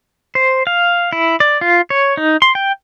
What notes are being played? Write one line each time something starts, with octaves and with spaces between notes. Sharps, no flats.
C5
F5
E4
D5
F4
C#5
D#4
C6
G5